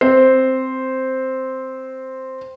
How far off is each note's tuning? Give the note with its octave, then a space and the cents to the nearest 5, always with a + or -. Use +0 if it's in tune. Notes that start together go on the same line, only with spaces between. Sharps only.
C4 +0 C5 +0